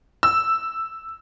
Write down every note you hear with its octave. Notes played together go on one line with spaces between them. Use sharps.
E6